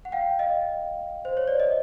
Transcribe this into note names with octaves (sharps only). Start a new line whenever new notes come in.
F#5
F5 G5
D#5 F5
C5
C#5
D5
D#5